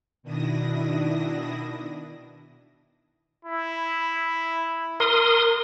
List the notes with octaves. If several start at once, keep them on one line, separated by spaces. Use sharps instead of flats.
B2 D#3 D4 E4 D#6 A#6
E4
A#4 C6 D#6